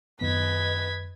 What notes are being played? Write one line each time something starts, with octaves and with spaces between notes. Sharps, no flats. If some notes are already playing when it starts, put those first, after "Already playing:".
F#2 D#3 B3 B4 D#5 G#6 B6